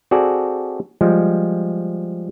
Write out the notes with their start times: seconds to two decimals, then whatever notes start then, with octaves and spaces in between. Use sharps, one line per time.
0.11 C4 F#4 G#4 A4 D5 G#5
1.01 F3 G3 G#3